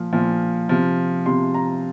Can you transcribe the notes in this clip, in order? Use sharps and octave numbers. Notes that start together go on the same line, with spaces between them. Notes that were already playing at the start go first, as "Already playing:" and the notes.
Already playing: A#2 F3
A#2 F3
C3 F3
C3 F3 C6
A#5